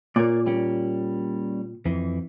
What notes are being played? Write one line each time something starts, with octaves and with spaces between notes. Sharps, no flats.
A#2 A#4 C#5 D5
G3 A#3 C#4
F2 E3